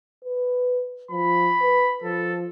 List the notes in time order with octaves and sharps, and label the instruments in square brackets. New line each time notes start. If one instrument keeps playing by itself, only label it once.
[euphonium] B4
[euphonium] F3 [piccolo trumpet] B5
[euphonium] B4
[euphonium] F3 [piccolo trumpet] A4